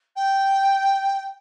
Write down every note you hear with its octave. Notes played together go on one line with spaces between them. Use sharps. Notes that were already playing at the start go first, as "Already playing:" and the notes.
G5